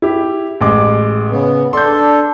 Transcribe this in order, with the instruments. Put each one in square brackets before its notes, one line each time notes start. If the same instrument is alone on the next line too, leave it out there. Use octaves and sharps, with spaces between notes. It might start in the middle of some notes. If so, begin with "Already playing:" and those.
[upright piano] E4 G4
A1 G#3 D6
[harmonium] C#3 B3
[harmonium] D4 A4 [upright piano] C6 G6